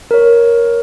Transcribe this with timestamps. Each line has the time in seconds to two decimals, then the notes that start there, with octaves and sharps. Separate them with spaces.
0.11 A#4 C#5